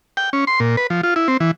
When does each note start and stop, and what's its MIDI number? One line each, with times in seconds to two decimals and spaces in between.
0.17 0.30 79
0.33 0.45 61
0.47 0.60 84
0.60 0.76 46
0.77 0.87 71
0.90 1.01 53
1.03 1.14 65
1.16 1.28 64
1.28 1.37 60
1.40 1.51 52